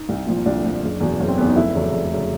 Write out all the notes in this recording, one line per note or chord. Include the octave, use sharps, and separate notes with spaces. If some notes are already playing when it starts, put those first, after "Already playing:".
Already playing: D#4
C2
A#2 F3
C2 D4
A#2 F3
F#1
E2 B2
F#1 C#4
C4
E2 B2 B3
D#4
F1 E4
E2 C#3 F#3 A3
F1
C#3 F#3 A3